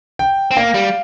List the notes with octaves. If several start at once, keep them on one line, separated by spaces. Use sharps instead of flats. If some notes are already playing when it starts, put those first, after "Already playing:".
G5
C4
A#3 F5
G3